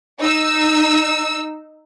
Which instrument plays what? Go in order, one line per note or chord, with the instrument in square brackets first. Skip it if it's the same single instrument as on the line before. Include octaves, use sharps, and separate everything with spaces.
[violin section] D#4 E6